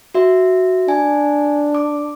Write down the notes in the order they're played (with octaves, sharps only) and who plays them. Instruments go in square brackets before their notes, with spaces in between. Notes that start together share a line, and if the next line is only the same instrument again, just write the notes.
[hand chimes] F#4 E5
[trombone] D4 [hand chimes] G#5
[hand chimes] D6